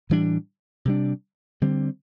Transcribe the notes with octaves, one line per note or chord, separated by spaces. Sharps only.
A2 E3 G3 D4
C3 G3 D4
D3 G3 C4